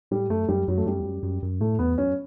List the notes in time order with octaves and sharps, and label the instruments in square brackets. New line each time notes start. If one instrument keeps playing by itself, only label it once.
[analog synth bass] A2 [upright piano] G3
[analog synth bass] F#2 [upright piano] A3
[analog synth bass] F#2 [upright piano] G3
[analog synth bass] F#2 [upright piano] F#3
[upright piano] A3
[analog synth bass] F#2 [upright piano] G3
[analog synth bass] E2
F#2
F#2
F#2
[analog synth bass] A2 [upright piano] A3
[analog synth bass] E2 [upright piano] B3
[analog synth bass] F#2 [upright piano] C#4